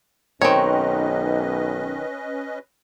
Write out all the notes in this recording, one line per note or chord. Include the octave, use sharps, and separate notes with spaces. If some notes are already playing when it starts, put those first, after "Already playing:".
B1 D#3 C4 C#4 B4 C#5 D#5